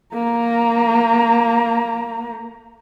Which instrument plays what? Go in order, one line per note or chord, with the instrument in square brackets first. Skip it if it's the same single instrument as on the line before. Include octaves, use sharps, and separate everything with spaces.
[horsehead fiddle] A#3 A#5